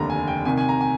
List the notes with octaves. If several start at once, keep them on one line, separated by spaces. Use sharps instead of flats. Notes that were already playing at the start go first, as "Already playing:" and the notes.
Already playing: F1 D#2 D3 A#5
G#5
G5
C2 C3 D#3 G#5
G#5
A#5
G#5